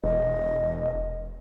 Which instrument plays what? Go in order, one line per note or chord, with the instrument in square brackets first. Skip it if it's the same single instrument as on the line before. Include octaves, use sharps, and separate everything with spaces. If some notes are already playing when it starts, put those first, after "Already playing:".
[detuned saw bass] E1 [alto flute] D#5